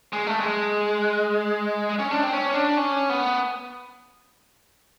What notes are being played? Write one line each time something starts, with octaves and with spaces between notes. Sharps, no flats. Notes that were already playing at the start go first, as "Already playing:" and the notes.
G#3
A3
G#3
C#4
D4
C4
C#4
D4
C#4
B3